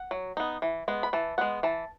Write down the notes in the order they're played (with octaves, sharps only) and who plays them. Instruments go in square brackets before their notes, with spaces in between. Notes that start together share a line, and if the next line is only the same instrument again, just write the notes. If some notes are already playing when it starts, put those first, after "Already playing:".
Already playing: [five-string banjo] F#5
F#3
B3 D#4
E3
G#3 B3
B5
E3 A5
G#3 B3 F#5
E3 A5